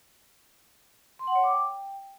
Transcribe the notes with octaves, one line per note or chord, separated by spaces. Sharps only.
C6
F#5
C#5
D6
G5